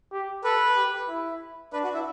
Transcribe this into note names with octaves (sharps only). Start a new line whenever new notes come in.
G4
A4 B4
G4
E4
D4 B4
F#4
E4